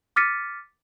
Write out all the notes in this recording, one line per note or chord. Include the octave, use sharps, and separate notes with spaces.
D6 F6 A6 B6 C#7 D#7